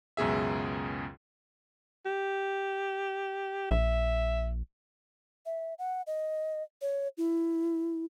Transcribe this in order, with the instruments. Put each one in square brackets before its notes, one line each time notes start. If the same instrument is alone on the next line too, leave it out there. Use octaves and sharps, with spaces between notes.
[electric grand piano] C#2 F#2 B2 G#4 E5
[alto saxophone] G4
[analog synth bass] A#1 [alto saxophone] E5
[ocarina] E5
F#5
D#5
C#5
E4